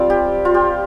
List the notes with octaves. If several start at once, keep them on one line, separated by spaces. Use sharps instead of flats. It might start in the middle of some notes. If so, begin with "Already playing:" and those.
Already playing: G3 C4 F4
G4
F4
G4